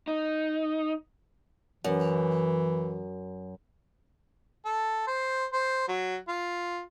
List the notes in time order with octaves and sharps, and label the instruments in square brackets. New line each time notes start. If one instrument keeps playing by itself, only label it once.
[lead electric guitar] D#4
[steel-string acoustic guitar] F#2 [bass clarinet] E3
[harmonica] A4
C5
C5
F#3
F4